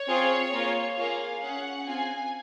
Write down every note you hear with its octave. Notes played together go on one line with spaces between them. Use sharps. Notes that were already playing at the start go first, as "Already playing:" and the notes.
Already playing: C#5
C4 F4 G#4
A#3 F4 G#4
A#3 F4 G#4 F5
C#4 G#4 F#5
C4 F4 G#4 G#5